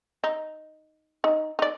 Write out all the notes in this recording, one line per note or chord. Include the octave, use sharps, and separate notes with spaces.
D#4
D#4
D#4 D5